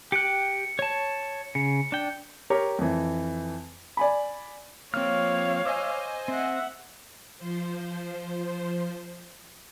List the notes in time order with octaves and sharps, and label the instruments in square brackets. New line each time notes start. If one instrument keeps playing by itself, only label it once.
[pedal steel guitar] G4 G5 F#6 [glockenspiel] C#7
[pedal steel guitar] C#5 A5
[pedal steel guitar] C#3 [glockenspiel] C#7
[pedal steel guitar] D4 G5
[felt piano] G4 A#4 C#5
F2 E3
D5 G#5 B5
[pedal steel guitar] F3 F6 [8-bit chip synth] A#3 C4 [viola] C#5 F5
[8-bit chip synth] C5 D#5 G#5 [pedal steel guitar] D6 E6
[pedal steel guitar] C4 [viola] E5 F#5
[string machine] F3 C5